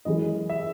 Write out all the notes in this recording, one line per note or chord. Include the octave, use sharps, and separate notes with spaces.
F#2 E3 G#3 D#5
E5